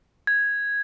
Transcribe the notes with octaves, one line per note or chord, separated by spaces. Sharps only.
G#6